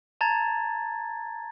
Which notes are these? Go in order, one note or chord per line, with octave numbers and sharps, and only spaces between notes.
A5 A#5 G#6 A6